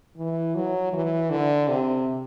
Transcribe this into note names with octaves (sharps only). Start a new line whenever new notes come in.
E3
F#3
E3
D3
C3